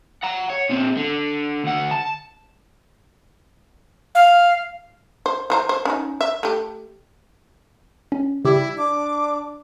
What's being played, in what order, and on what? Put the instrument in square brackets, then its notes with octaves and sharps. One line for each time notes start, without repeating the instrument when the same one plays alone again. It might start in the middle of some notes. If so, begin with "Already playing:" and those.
[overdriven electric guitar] F#5 A#5
C#5
A#2 C4
D3
D2 F#5
A5
[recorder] F5
[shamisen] C5
E3 C5 A#5
C5
C#4 D#4
E5
A3 G4
[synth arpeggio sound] C#4
[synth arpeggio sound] C#3 G4 [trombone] G3 [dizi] E4
[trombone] D4 [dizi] D6